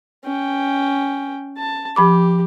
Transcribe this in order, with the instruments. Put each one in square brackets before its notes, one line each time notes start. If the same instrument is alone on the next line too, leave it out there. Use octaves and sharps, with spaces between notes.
[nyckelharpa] C#4 G5
A5
[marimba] F3 B5 D6 [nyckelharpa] G4